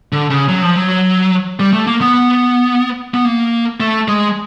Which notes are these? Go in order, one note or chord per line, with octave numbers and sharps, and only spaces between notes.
D3
C#3
F#3
F3
F#3
G3
A3
A#3
B3
B3
A#3
A3
G#3